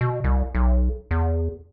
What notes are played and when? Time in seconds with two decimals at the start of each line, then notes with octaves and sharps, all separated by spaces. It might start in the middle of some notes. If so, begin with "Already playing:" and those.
0.01 B2
0.24 C2
0.55 B1
1.11 E2